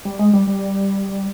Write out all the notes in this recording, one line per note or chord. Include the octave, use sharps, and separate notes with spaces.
G3
G#3
G3
G3